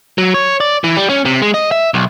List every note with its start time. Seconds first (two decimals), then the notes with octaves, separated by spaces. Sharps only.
0.18 F#3
0.34 C#5
0.60 D5
0.84 E3
0.97 G3
1.09 C#4
1.25 C3
1.42 G#3
1.54 D#5
1.71 E5
1.94 B1